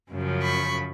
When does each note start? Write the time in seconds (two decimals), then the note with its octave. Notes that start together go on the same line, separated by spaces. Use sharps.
0.10 F#2 C#3 F3
0.42 B5 C#6